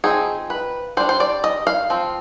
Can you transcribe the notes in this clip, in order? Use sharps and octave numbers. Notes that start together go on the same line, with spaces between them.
F3 C4 D#4 G#4
B4
G3 D4 C5
C5
D5
D#5
F5
F3 C4